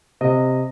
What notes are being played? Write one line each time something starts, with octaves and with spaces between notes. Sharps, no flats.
C3 D#5